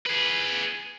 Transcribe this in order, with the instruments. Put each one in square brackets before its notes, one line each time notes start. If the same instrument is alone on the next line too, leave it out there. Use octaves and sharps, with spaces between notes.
[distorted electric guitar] G#4 B4